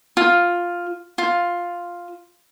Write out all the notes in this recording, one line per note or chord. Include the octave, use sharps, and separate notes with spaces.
F4
F4